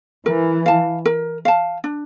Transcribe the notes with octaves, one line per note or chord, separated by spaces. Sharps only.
E3 A#4
F5 A5
A#4
F5 A5
D4